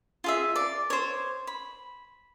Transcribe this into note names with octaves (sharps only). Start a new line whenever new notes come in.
F4 G#4 E5
D5
C5 C#5
B5